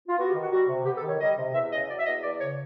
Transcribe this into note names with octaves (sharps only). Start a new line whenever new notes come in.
F4
B3 F#4
G4
D#3
F#4
G3 F#4
C3
B3 G4
A4
D#3
C#5
G3 D#5
C3
E2 E5
C#3 D#5
F#3 D5
E5
E2 D#5
E2 D5
C#3 C#5